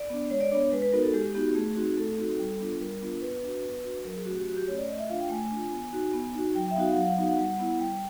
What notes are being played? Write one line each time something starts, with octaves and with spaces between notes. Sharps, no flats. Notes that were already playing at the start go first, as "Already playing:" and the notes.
Already playing: D5
B3 D4
G#3 C#5
D5
B3 D4 C#5
G#3 B4
B4
B3 D#4 F#4 A#4
A4
G#3 G4
B3 D#4 F#4 G4
A3 G#4
C4 D#4 F#4
A3 A4
C4 D#4 F#4
G3
B3 D4 F4
G3 A#4
B3 D4 F4
B3 B4
D4 F#4
B3
D4 F#4
F#3 A#4
G#4
A3 C#4 F#4
G4
F#3 F#4
G4
A3 C#4 C#5
D5
A3 D#5
E5
D4 F4 F5
G5
A3 G#5
D4
F4
B3
D#4 F#4
B3
D#4 F#4
F#3 G5
G5
E5
B3 D#4 F#4 F5
F5
F#5
F#3 F5
F#5
B3 D#4 F#4 F5
F#5
G3 F#5
B3 E4
G3 G5